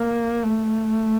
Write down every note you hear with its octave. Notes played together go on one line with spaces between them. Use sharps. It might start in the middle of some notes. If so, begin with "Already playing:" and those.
Already playing: A#3
A3